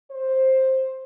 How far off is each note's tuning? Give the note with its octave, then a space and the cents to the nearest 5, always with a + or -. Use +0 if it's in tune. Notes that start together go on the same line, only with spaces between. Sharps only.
C5 +10